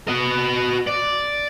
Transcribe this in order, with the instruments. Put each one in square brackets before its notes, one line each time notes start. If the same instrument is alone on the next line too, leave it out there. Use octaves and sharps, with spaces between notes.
[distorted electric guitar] F#4 D#5
D5